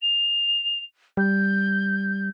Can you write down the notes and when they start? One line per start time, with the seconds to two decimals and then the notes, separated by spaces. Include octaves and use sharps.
0.01 F7
1.17 G3 G6